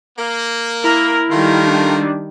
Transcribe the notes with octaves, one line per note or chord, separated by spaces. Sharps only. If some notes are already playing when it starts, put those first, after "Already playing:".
A#3
E4 A#4
D#3 G3 A3 F4 A#4
D4